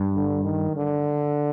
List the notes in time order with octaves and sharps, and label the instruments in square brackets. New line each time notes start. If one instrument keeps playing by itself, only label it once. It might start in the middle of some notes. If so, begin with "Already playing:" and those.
Already playing: [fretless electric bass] G2
[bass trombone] D3
D#3
D3